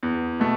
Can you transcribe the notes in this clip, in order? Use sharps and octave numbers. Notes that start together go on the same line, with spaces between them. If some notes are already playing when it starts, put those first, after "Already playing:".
E2
B2 A3